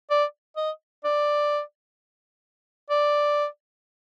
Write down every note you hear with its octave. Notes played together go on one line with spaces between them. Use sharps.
D5
D#5
D5
D5